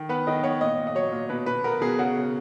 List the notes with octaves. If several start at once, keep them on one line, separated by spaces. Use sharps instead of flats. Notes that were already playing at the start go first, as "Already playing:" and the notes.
Already playing: D#3
B3 B4
D#3 D#5
B3 C#5
A#2 D#5
A#2
D#5
F#3 C#5
A#2
B2 B4
B2 B4
B3 A#4
B2 G#4
C#3 F#4
C#3